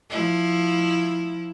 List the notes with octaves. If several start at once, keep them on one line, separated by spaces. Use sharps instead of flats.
F3 E4